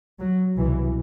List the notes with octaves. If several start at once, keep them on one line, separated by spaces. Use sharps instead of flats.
F#3
C2 B2 E3